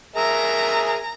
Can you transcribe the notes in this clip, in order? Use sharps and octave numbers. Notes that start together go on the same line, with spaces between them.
G#4 A#4 E5 A#5